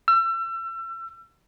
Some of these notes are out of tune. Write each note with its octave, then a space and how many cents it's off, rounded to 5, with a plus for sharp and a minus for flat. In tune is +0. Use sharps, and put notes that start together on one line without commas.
E6 +35